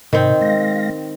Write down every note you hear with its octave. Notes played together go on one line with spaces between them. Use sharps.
G#2 C3 D#3 C4
G#3 F5 A#6